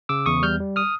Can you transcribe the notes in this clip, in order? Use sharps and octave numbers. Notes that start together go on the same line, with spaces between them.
C#3 D6 E6
E2 C#6 D#6
G3 F6 G6
G3
D#6 F6